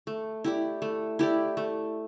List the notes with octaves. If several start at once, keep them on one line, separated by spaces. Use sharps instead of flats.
A3
E4 G4 D5
A3
E4 G4 D5
A3